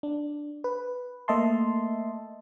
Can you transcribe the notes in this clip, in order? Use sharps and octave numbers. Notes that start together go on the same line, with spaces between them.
D4
B4
A3 A#3 D#5 E5 A5 C6